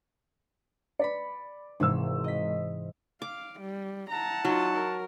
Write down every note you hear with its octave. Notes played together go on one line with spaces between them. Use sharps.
B4 D5 B5 B6 C#7
G#1 G#2 C3 E3 E6
D#5 B6
F5 D6
G3
E4 F#5 A5 A#5
F#3 D#4 F4
A#4